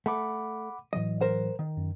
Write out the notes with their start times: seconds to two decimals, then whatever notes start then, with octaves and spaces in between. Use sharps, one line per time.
0.06 A3 F#5 B5 D6
0.93 A2 E3 F#3 D#5
1.21 A#4 C5 F#5
1.59 D#3
1.77 F#2